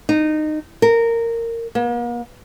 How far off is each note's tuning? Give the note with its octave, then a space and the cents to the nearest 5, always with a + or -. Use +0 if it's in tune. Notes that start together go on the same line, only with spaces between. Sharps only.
D#4 -20
A#4 -15
A#3 +45